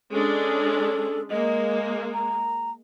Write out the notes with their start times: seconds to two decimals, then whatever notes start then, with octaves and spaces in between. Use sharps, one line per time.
0.12 G#3 C#4 D4 A4
1.30 G#3 A#3 D#5
2.14 A#5